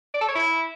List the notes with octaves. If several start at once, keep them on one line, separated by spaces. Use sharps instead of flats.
D5
A4
C#5
E4